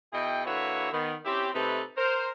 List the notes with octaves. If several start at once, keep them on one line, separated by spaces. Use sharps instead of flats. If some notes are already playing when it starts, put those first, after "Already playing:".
B2 E4 G#4 D#5 G5
D3 A#3 E4 F#4 B4 C#5
D#3 B3
C4 C#4 E4 G4
C3 A3 D#4 A4 B4
A#4 C5